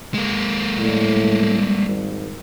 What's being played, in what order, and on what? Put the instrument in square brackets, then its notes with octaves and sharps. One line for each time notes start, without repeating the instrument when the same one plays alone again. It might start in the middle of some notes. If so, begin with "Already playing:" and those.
[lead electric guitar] G#3 A#3
[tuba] A2 [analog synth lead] G3
[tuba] G#1